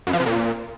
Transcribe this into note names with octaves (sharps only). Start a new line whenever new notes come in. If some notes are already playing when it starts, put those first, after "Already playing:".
F#2
F3
C3
A#2